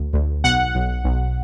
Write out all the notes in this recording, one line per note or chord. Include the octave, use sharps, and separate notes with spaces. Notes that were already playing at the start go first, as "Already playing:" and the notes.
Already playing: D2
D2
B1 F#5
B1
B1